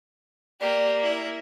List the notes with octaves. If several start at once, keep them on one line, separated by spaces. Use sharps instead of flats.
A#3 G4 D5
E4